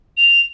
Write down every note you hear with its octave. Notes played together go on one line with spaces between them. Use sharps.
F7